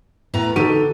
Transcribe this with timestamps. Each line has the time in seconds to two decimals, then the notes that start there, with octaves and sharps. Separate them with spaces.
0.34 A2 B3 A#5
0.56 D3 D#4 F#4 G4 A4 D#7